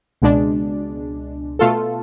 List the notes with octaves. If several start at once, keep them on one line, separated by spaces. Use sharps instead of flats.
C#2 B2 G#3 D4
B2 A3 F4 A4